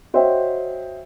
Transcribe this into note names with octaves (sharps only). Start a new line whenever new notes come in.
F#4 C5 C#5 D#5 E5 G5